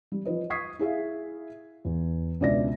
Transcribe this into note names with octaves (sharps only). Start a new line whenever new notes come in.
G3
F3 B4 D#5
C#6 D#6 G#6 B6 C7
E4 G#4 E5 F5
E2
C#2 B2 D4 D5 E5 A#6